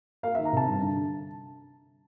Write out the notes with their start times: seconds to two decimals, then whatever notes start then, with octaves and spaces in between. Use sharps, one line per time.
0.23 A#3 F5
0.35 E5
0.38 D#3
0.45 A#5
0.52 C3 A5
0.68 G2
0.82 D3